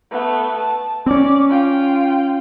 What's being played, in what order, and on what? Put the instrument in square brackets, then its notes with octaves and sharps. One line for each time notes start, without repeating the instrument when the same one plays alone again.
[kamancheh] A3 B3
A5
[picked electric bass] C4 C#4 [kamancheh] D5
[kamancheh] F4 G5